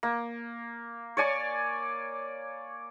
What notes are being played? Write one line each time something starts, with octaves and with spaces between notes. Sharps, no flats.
A#3
C#5 D5 G#5 C#6